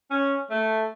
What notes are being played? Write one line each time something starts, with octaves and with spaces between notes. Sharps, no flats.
C#4
A3